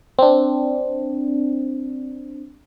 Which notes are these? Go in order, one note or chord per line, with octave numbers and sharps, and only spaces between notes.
C4 D4